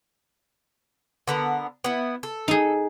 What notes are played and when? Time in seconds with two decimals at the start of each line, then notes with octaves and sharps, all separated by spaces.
1.28 D3 B3 A#4
1.84 B3 E4
2.23 A4
2.48 D#4 G#4